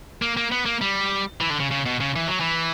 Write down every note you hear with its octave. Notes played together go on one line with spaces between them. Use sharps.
A#3
A#3
B3
A#3
G3
E3
D3
C#3
C#3
B2
C#3
E3
F#3
E3